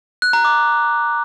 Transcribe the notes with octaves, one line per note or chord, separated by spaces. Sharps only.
F#6
A#5
D6